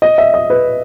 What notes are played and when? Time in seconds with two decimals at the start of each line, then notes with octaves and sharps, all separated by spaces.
0.02 D#5
0.18 E5
0.34 D#5
0.50 B4